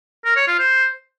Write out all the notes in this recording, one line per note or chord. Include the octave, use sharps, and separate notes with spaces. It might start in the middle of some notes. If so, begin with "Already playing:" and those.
A#4
C#5
F4
C5